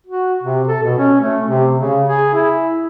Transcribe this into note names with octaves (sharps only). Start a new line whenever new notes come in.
F#4
C3
A4
B2
C#4
A3
C3
C#3
G#4
E4